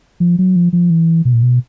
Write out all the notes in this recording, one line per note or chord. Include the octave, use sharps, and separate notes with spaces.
F3
F#3
F3
F3
E3
B2
A#2
B2